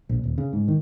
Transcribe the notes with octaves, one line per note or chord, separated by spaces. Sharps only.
A#1
D#1
C#3
G#2
D#3